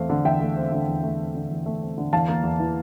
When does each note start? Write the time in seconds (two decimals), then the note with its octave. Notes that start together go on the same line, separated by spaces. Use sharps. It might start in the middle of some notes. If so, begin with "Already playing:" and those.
Already playing: E2 A3 C4 F5
0.10 D3
0.25 E2 E5 G5
0.41 A3
0.57 C4
0.72 D3
0.88 E2
1.03 A3
1.19 C4
1.35 D3
1.50 E2
1.66 A3
1.82 C4
1.98 D3
2.13 E2 F5 A5
2.28 A#3
2.44 E2
2.59 E3